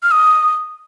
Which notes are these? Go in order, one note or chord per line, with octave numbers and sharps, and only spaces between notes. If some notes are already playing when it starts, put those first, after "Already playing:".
F6
D#6